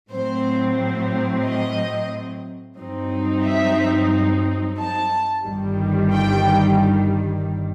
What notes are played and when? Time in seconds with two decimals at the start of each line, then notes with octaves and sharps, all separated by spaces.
0.11 A2 F#3 C4 C5
1.45 D#5
2.78 G2 F#3 C4 D#4
3.45 E5
4.78 A5
5.45 G1 G2 D#3 G3
6.12 G5